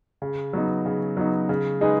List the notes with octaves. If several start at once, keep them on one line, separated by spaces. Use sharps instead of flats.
C#3
F#3 B3 D#4
C#3
F#3 B3 D#4
C#3
G#3 D#4 G#4 B4